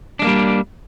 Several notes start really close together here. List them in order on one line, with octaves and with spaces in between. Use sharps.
D4 G#3 A#3 G3